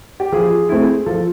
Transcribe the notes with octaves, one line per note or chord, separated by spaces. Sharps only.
G4
F3 G#4
A3 C4 E4
F3 A4